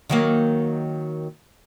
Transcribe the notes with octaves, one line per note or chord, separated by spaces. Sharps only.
D#3 F#3 A#3